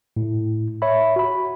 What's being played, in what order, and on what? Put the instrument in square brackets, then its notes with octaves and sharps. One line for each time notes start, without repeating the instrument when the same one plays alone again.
[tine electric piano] A2
C#5 E5 B5
F#4 B5